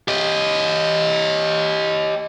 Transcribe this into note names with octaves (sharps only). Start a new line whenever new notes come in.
G4 D#5